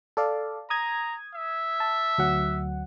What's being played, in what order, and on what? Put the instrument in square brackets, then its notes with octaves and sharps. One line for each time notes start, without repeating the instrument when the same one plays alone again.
[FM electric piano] A4 D5 F5
[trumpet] A#5 [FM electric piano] D#6 G#6
[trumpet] E5
[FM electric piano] A5
D2 F#3 F#5